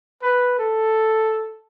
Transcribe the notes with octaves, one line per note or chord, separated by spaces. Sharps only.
B4
A4